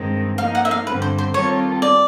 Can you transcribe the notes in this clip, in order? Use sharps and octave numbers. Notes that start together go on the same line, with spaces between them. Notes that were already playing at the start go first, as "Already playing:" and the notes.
Already playing: G2 D#3 G#3 C4
F3 A#3 D#4 F5
F#5
E5
F5
G2 D3 G3 C4 B4
C5
C5
D#3 G3 C4 F4 A4 C#5
D5